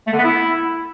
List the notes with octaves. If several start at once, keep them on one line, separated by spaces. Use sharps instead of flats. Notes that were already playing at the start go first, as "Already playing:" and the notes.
A3
D3
B3
E4